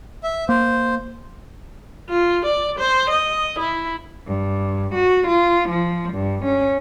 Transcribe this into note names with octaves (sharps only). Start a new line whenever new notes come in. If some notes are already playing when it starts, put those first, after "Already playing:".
E5
A#3 C5
F4
D5
C5
D#5
E4
G2
F#4
F4
F3
G2
C#4